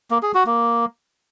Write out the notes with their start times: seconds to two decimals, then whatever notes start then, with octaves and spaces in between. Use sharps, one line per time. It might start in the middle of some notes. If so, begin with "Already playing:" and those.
0.11 A#3
0.23 G#4
0.34 F#4
0.46 A#3